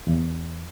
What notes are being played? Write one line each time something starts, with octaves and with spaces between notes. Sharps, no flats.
E2